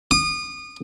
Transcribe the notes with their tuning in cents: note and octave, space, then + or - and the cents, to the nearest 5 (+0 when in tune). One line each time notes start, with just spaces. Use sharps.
D#6 -30